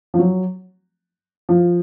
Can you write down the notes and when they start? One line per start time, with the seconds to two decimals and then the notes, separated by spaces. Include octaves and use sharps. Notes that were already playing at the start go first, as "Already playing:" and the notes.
0.14 F3
0.19 F#3
1.49 F3